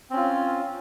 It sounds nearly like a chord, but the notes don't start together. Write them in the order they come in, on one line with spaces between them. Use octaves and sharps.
C4 C#4 F4